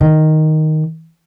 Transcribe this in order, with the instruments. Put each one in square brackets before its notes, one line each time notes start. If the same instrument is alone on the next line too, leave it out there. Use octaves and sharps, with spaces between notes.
[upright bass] D#3